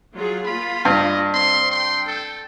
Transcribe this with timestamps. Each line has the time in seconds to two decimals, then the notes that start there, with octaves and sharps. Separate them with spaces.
0.16 F#3 F4 G#4
0.46 A#3 F4 B5
0.85 G2 D#5
1.34 C4 C6
1.72 G5 C6
2.07 A4